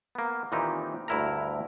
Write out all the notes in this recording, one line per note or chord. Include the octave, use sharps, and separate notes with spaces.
A#3 B3
A#2 D#3 E3 C4 D#4 G4
D2 G2 E4 A#4 A#5